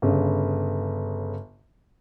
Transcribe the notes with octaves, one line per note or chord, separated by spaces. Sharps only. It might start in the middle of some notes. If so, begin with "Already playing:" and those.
G1 C#3